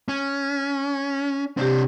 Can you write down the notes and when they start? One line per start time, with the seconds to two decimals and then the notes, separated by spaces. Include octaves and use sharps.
0.08 C#4
1.57 C3 C4 D4 G4